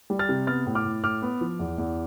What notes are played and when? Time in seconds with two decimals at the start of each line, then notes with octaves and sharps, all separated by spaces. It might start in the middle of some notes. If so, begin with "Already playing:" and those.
0.10 G3
0.19 F6 A6
0.29 C3
0.47 B3 F6 A6
0.66 A2
0.75 D6 F6
0.85 A2
1.03 A2 D6 F6
1.22 B3
1.41 F3
1.59 E2
1.78 E2